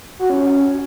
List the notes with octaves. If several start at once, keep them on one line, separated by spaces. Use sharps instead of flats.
F#4
C#4
C#4